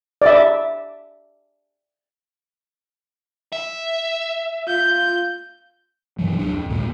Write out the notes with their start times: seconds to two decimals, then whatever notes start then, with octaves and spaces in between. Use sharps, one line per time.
0.22 D5 E5
3.52 E5
4.68 F4 G6
6.19 G2 B2 E3 F#3
6.39 D2 F#3 D4
6.54 F2
6.70 E2 A#2 D3 G#3